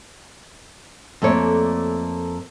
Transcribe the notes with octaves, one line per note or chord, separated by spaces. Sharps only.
F2 A3 A#3 C#5 D5